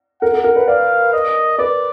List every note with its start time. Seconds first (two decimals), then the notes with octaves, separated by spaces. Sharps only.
0.22 A#4 F#5
0.34 A#4
0.44 A#4
0.56 B4
0.67 D5 F5
1.13 D#5
1.58 B4 D5